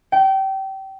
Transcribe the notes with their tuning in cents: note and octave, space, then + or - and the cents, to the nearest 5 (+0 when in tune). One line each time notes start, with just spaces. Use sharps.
G5 -25